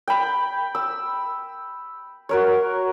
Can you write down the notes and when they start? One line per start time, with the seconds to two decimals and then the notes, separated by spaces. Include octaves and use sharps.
0.08 G5 B5
0.75 E6
2.29 F#4 A#4 C#5